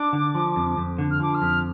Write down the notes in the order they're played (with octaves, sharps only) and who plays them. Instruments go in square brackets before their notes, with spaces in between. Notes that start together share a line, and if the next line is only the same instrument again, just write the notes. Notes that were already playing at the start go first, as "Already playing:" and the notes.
Already playing: [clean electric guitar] D4 [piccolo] D6
[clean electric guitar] D3
F3
F2
F2
D3
[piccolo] F6
[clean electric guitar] F3 [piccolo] D6
[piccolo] F6
[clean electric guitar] F2